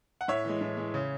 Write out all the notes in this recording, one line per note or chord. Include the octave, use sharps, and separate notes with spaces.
F#5
A2 C#5 E5
E3 G#3
A2
E3 G#3
C#3